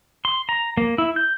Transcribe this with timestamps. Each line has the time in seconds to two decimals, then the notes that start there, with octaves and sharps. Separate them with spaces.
0.25 C6
0.49 A#5
0.77 A#3
0.98 E4
1.16 G6